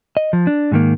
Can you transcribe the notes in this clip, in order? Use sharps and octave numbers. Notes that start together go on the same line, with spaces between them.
D#5
F3
D4
G#2 D#3 A#3